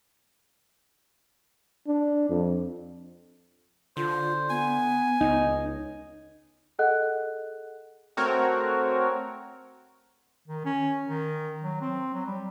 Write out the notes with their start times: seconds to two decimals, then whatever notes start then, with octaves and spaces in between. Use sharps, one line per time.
1.87 D4
2.29 F2
3.97 D3 F4 C5
4.50 B3 G#5
5.21 C#2 D#4
6.79 G#4 A4 D#5 F#5 F#6
8.17 A3 C4 F#4 A#4 C#5
10.48 D#3
10.65 C#4
11.06 D#3
11.63 F#3
11.81 C4
12.14 F#3
12.26 G3